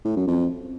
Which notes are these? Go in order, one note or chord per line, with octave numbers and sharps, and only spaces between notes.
A2
F#2
F2